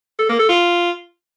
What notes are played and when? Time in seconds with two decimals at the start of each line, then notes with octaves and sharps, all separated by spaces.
0.19 A4
0.29 A#3
0.39 A4
0.49 F4